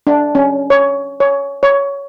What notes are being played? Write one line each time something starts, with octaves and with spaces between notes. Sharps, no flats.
D4
C#4
C#5
C#5
C#5